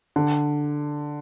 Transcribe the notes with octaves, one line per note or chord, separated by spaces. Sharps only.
D3